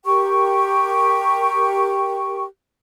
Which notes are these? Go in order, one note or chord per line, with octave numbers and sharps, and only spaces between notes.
G4 A#4 G5 C#6